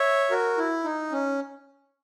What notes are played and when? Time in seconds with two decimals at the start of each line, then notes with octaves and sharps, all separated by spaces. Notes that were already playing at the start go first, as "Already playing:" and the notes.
Already playing: C#5 E5
0.31 F#4 A#4
0.58 E4
0.84 D#4
1.12 C#4